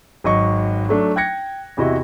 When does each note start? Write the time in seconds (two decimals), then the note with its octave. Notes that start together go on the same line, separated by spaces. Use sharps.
0.24 G#1 F#3 D#5 C#6
0.89 F#3 A3 D4
1.16 G5 F#6 G#6 A#6 C#7
1.77 E2 C3 E4 F#4 D#5